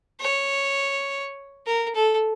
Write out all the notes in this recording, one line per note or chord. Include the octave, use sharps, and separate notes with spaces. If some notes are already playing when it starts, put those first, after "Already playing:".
C#5
A#4
A4